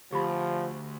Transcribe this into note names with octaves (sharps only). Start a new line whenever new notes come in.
D2 F3 G4 B5